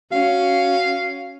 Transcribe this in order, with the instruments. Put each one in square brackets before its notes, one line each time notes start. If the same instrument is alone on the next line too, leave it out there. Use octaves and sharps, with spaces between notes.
[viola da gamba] C#4 [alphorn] F#4 [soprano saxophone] F5